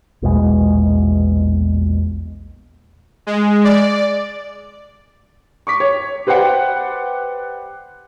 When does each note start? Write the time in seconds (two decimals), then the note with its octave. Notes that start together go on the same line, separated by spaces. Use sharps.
0.22 A#1 E2 B2 G#3
3.27 G#3
3.64 D5
5.67 C#6 D6 B6
5.80 C#5
6.27 G4 B4 C5 D5 F#5 G5